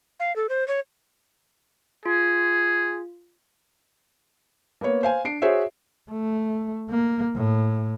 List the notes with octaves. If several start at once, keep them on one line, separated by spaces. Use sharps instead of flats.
F5
A4
C5
C#5
F4 G#4
A#3 B3 B4 C#5
C5 F5 G#5
D4 C7 D7
F#4 G#4 C5 C#5 E5
A3
A#3
A2